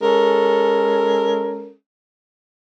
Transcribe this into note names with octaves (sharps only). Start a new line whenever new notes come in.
G#3 C#4 A4 A#4